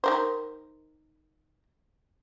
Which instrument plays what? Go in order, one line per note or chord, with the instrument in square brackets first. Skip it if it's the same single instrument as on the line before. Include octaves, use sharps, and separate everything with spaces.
[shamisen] D#3 A#4 C5